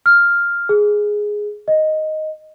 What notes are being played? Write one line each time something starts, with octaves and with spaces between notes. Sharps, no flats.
F6
G#4
D#5